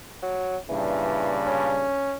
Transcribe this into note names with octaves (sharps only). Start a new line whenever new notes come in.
F#3
G2 A#2 C#3 E3
C#4